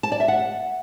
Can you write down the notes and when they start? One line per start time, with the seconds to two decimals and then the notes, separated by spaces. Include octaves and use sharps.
0.03 A5
0.12 D5
0.20 E5
0.28 F#5